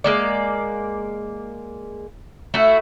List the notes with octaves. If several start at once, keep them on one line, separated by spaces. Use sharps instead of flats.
G#3 A#3 D5
A3 E4 F#4